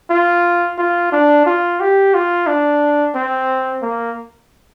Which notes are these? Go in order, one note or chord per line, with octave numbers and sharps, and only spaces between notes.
F4
F4
D4
F4
G4
F4
D4
C4
A#3